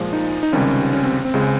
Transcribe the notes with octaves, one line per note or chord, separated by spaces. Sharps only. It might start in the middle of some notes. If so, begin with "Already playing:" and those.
Already playing: A#2 F3 G#3
D#4
D#4
C#2 C3 D#3 G3 C#4
C#4
C4
C4
C#2 C#3 G#3